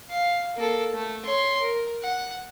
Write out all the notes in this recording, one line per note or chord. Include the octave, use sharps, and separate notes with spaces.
F5
A#3 A4
A3
C#5 C6
A#4
F#5